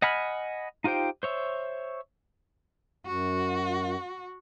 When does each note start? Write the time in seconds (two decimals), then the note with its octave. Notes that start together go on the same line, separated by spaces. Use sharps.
0.02 D#5 F#5 G#5 B5 F6
0.84 D#4 F4 G4 C5 G5
1.23 C5 C#5 E5
3.06 F#2 F#4